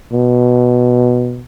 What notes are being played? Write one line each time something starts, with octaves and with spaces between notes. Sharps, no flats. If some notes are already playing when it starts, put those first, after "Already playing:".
B2